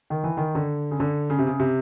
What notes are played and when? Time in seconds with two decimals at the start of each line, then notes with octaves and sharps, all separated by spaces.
0.10 D#3
0.24 E3
0.37 D#3
0.55 D3
0.91 C#3
1.00 D3
1.30 C#3
1.39 C3
1.47 C#3
1.60 C3